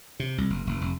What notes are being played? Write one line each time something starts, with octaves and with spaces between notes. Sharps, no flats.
C3
C2
F#1
F1
F1